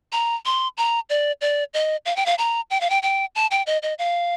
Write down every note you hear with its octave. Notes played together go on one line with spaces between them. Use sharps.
A#5
C6
A#5
D5
D5
D#5
F5
G5
F5
A#5
G5
F5
G5
G5
A5
G5
D#5
D#5
F5